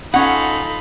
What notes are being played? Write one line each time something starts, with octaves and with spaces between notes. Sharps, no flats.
C#4 D#4 F4 A4 F#5 B5